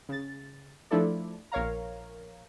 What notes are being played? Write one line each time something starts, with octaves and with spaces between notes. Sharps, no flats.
C#3 A6
F3 A3 D4 E4 A4 D5
A#1 A#4 C#5 F5 A#5